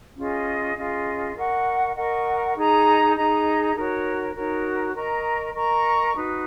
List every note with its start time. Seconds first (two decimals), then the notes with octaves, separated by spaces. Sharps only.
0.17 C#4 F4 G#4 D#5
0.76 C#4 F4 G#4 D#5
1.36 A#4 D#5 F#5 C#6
1.96 A#4 D#5 F#5 C#6
2.55 D#4 G#4 D#5 A#5
3.16 D#4 G#4 D#5 A#5
3.75 D#4 F#4 A#4 C#5
4.35 D#4 F#4 A#4 C#5
4.94 A#4 D#5 A#5 C#6
5.53 A#4 D#5 A#5 C#6
6.14 D#4 F#4 B4